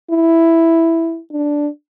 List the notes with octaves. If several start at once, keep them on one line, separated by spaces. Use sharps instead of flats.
E4
D4